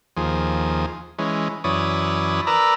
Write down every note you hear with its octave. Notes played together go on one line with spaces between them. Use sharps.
D#2 F3 G#4
E3 G#3 C#4
F#2 E3 C#5 D5 B5 D#6
A#4 B4 D5 A#5 B5 E6